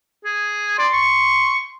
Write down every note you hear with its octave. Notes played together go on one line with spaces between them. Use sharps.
G#4
D5 C6
C#6